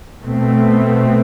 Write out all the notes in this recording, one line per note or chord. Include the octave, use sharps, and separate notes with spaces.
B2 A3 C4